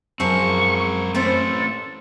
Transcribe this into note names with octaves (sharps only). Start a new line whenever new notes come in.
F#2 F3 C4 G#4 A#4 C5 C#6
A3 C4 C#4 E4 A4 C5